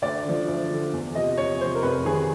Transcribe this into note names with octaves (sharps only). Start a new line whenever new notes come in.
D2 D5
D3 F3
D2
D3 F3
E2
C3 F3 D#5
E2 C#5
C3 F3 C5
A#4
F1 B4
F2 C3 D#3 G#4